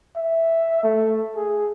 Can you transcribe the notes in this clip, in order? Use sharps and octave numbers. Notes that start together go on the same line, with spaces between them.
E5
A3
G#4